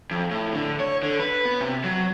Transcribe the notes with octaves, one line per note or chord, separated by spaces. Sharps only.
F2
A2
D3
C#5
D3
B4
B3
C3
F#3